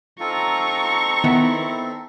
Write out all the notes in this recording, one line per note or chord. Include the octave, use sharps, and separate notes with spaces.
C4 D#4 F4 A4 A#5 C#6
D#3 B3 E4